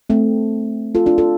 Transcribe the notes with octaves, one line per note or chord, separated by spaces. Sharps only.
A3 C4
F4 A4
D4 F4
F4 A4